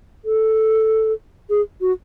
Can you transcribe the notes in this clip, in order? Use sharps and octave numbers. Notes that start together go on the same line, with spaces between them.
A4
G#4
F#4